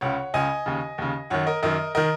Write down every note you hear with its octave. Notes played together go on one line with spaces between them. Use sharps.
C#2 C#3 C#5 F#5
C#2 C#3 D#5 G#5
D#2 C#3
D#2 C#3
F#2 D#3 C#5 F#5
A#4 D#5
F#2 D#3 A#4 D#5
D#3 A#4 D#5